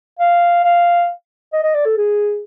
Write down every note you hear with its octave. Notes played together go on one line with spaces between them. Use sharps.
F5
F5
D#5
D#5
D5
A4
G#4